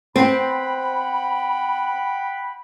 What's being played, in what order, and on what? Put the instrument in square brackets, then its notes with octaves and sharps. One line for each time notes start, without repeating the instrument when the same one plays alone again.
[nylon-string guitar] C4 [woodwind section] F#5 G5 B5